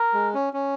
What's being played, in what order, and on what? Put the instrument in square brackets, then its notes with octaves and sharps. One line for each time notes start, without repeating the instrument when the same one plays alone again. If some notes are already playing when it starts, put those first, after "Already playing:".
Already playing: [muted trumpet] A#4
[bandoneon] G#3
C#4
C#4